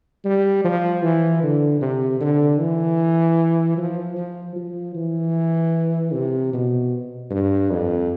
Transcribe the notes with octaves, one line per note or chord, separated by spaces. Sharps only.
G3
F3
E3
D3
C3
D3
E3
F3
F3
F3
E3
C3
B2
G2
F2